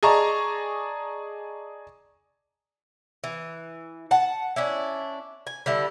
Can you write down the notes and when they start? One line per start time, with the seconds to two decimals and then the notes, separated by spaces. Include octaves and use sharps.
0.03 G#4 D5 D#5 A5 A#5 C#6
3.24 E3
4.11 F#5 A5
4.56 C#4 D4 E4
5.47 G#5
5.66 D3 G3 E4